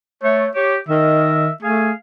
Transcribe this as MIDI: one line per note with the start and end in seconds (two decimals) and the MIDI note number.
0.23 0.46 57
0.23 0.50 73
0.55 0.77 67
0.55 0.76 73
0.89 1.49 51
0.89 1.52 70
0.89 1.52 75
0.89 1.52 76
1.62 1.91 57
1.62 1.91 68
1.62 1.91 77
1.62 1.91 80